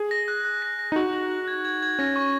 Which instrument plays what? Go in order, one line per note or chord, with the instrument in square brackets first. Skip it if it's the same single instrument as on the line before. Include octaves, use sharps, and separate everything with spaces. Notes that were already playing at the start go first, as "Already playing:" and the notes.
Already playing: [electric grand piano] G#4
[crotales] A#6
F#6
F#6
A#6
A#6
[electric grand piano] D#4
[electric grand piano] F#4 [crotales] F#7
[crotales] F#7
F#7
G#6
G#6
G#6
[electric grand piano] C#4 [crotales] A#6
[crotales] C#6